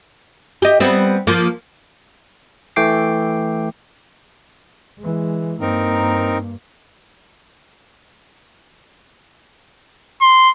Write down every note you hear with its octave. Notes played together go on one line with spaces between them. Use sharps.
G4 D#5
G3 B3 C4
F3 A#3
E3 A3 G5 D6 C7
E3 G#3
G2 A#3 C4 D#4 A#4
C6